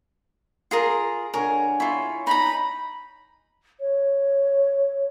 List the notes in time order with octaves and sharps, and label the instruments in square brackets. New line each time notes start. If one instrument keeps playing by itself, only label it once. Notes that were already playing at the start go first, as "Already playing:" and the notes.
[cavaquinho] F4 G#4 A#4
[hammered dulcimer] D3 C#5 G#5 [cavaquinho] A#4
[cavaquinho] E4 F4 [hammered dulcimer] C#5
[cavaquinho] D#4 A#5 [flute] B5
[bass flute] C#5